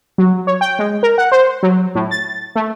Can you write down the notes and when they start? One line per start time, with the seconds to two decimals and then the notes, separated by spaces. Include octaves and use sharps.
0.18 F#3
0.47 C#5
0.61 G5
0.79 G#3
1.03 A#4
1.18 F#5
1.32 C5
1.63 F#3
1.95 A2
2.11 A6
2.56 A3